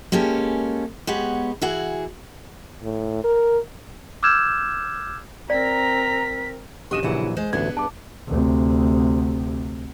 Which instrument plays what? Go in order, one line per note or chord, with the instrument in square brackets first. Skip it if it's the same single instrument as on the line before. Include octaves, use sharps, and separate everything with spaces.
[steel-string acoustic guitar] G#3 A#3 C#4 G4 A4
G#3 B3 G4 C#5 F#5
E3 E4 F#4 G#4 F#5
[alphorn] A2
A#4
[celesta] D6 E6 F6 G6 G#6 E7
[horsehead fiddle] C4 A#4 [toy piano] D5 [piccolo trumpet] A#5 [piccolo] B6
[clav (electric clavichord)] B1 F#4 D#5 [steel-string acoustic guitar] C#4 D4 [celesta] G4 D#7 E7
[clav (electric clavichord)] A#1 E3 F#3 [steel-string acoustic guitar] C#3 E4 F#5
[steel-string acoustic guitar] G#3 C5
[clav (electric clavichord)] A1 D2 [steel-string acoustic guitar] B3 D4 G#4 [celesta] G#6
[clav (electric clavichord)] G2 [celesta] A5 D6
[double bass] D2 C3